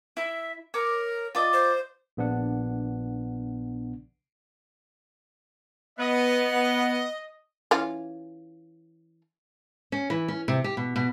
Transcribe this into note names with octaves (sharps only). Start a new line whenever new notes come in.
E4 E5
A#4 C#5 D6
F4 D5 D#5
C5
A#1 B3 D4 F#5
B3 D#5
E3 C#4 F4
C#4
E3
C#4
C3
G4
B2
B2